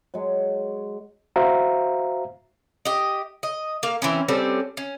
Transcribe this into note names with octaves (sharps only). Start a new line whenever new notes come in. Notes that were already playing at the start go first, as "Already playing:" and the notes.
F#3 G#3
F#4 C5 E5 F5 A#5
G4 D#5
D#5
A#3 F5
E3 C4 C#4
G3 C4 C#4 A4
C#4